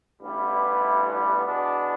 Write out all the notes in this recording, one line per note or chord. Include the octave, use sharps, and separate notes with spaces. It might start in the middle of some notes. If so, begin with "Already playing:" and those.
A1 G2 G3 B3 E4
E2 B2 B3 D4